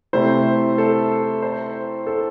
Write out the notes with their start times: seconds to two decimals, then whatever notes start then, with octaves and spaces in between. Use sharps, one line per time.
0.13 C3 A3 E4 C5
0.78 A4
1.42 C5
2.07 A4